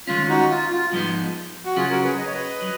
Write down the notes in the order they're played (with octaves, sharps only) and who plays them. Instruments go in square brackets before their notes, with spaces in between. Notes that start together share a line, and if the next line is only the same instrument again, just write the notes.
[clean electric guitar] D#3 G#3 C#4 [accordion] F4
[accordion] D#4 F#4
F4
F4
[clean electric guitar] G#2 F3 G#3 B3 D#4
[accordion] F#4
[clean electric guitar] C#3 F#3 C#4 [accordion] F4 G#4
[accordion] F#4 A#4
G#4 B4
D#5
C#5
B4 D#5
[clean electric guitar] F#3